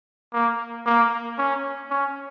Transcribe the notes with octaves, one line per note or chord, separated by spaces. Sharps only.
A#3
A#3
C#4
C#4